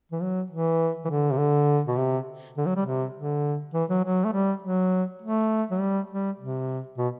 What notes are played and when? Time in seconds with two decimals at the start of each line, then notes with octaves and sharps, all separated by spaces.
0.12 E3
0.21 F#3
0.51 E3
1.05 E3
1.10 D3
1.32 C3
1.38 D3
1.87 B2
1.97 C3
2.57 D3
2.66 F#3
2.76 G3
2.86 C3
3.16 D3
3.74 E3
3.89 F#3
4.04 F#3
4.24 A3
4.33 G3
4.62 F#3
5.22 A3
5.71 F#3
5.80 G3
6.10 G3
6.39 C3
6.98 B2